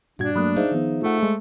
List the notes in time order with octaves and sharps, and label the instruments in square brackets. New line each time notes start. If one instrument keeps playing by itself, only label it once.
[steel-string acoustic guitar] G2 [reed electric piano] A#2 F#4 G#6 [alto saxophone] D4
[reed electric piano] F#3 A3 A#3 [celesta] B5 D#6 F#6
[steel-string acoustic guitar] D#4 E5 [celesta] G#4 C5 F5
[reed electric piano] D#3 F3 B3
[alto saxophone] A3 [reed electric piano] F4 F#5
[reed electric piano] G#3